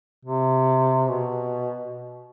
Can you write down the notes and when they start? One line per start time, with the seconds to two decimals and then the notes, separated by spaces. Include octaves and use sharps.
0.25 C3
1.08 B2